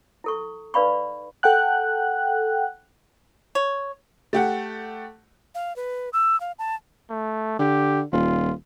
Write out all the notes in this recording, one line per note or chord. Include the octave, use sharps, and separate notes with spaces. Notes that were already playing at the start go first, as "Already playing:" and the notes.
E4 A4 C#6
D#4 B4 D5 F5 B5 C#6
A4 F#5 G5 F#6
C#5
A3 G4 F#5
F5
B4
E6
F5
A5
A3
D3 G4
D#1 F4